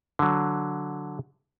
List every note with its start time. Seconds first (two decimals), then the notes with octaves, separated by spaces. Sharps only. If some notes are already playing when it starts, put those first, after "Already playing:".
0.19 D3 F#3